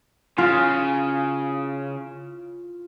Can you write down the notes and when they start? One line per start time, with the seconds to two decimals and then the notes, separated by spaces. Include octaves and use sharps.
0.38 C#3 F4